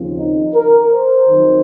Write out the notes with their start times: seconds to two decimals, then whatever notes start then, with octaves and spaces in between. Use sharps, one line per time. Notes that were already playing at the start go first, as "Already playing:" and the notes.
Already playing: D#2 C#3 F3 C4
0.17 D#4
0.54 A#4
0.90 C5
1.28 F2 D#3 F#3